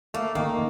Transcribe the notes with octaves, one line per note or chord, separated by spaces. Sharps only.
A3 A#3
D#3 A#3